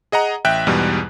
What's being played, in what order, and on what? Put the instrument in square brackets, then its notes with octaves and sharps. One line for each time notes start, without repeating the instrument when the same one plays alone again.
[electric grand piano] G#4 D#5 F#5 A#5
A1 E5 G5 F#6
E2 G#2 B2 G3